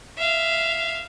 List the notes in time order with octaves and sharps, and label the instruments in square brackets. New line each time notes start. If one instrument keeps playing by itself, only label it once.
[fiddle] E5 F5